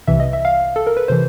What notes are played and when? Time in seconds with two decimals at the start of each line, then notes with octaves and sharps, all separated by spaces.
0.07 C2 C3 E3 E5
0.20 D#5
0.33 E5
0.45 F5
0.76 A4
0.87 A#4
0.97 B4
1.08 C3 E3 C5